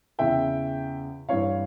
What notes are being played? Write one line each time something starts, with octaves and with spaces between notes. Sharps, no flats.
E2 C#3 E3 E5 G5
G2 E3 C#5 F5